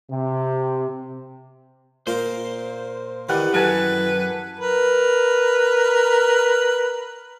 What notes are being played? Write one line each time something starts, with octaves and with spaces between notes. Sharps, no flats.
C3
A#2 A#3 C5 F5
D#3 E3 G3 F#5 D6
F#2 A4 B4 G#5
A#4 B4